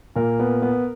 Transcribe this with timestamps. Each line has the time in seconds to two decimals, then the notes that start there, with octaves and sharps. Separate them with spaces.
0.16 A#2 A#4
0.40 B3
0.62 B3